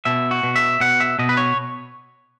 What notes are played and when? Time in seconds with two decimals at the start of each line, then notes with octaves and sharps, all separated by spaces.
0.05 B2 E5
0.31 F#4
0.43 B2
0.56 E5
0.80 B2 F#5
1.00 E5
1.19 B2 D#5
1.29 B4
1.37 C#5